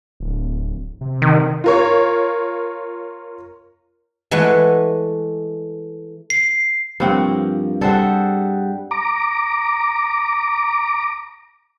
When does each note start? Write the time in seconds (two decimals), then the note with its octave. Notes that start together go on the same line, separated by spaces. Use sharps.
0.20 D1
1.01 C3
1.22 D#3
1.64 F4 A#4 C#5
4.31 E3 G#3 A3 B4 F#5
6.30 C7
7.00 G2 F3 A#3 C4 F#5
7.81 G3 G#4 A4 C5 E5 F#5
8.91 A#5 D6